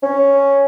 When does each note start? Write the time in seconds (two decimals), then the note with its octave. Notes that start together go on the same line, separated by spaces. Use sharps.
0.03 C#4